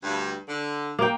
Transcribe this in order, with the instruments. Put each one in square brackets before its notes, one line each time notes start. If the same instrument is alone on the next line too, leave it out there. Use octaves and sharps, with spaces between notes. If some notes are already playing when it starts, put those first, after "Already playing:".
[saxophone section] D2 G2
D3
[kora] A#3 G5